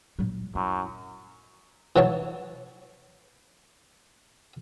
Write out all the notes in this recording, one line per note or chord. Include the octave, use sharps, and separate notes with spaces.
A#2 F#3
F#2 E4
E3 F#3 C#5 A5